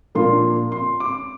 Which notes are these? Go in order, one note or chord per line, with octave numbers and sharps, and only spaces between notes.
A#2 F3 A#3 D4 F4 C6
C6
D6